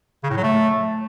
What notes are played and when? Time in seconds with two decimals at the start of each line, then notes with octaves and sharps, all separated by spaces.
0.23 C#3
0.30 A2
0.37 F#3
0.44 A3